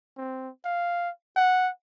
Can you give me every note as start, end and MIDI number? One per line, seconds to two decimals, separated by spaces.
0.18 0.49 60
0.65 1.10 77
1.36 1.70 78